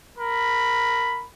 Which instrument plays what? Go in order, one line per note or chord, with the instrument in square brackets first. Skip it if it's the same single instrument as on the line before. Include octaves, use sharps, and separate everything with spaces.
[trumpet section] A#4 B5